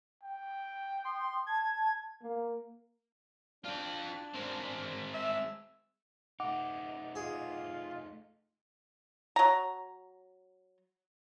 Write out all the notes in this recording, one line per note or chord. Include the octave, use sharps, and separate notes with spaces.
G5
C6 D#6
A5 G#6
A#3
D4 F4 G5
G#3 C4
E5
A3 D#4 F#5 D6
F4 G#4
F#3 A#5